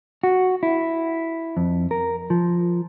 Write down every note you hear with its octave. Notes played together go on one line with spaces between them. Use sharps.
F#4
E4
F2
A#4
F3